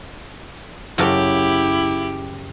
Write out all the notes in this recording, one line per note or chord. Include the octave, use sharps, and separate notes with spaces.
F#2 C#3 E4 G4 A4